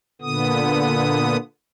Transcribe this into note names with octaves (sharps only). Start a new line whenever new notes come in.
A#2 D3 B3 D#6